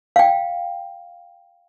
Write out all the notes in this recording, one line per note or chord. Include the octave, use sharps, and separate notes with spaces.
F5 G5